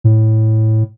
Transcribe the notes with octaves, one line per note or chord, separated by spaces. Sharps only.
A2